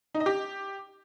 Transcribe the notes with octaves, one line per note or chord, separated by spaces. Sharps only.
D#4
D#5
G4